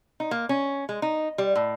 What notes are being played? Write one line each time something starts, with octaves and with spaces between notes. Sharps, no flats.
D#4
A#3
C#4
G#3
D#4
G3
A2